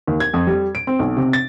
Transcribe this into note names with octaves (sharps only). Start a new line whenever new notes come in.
D#2
G#6
F2
G3
D7
C4
B1
C3
A6